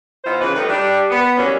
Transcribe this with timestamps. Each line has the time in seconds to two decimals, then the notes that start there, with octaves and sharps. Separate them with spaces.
0.25 E3 B3 D#4 F4 C5
0.40 C#3 E3 F3 B4
0.55 D#3 G3 A3 D#4 B4
0.68 G3 D4
1.10 B3
1.37 E3 F#3 G3 A#3 C#4 D4